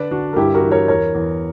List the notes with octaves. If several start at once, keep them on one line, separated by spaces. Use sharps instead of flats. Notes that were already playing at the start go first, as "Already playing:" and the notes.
Already playing: D3 B4 D5
D3 D4 F#4
A#4
G2 E4 G4
F#4 A#4
E3
A#4 C#5
E2 A#4 C#5
E2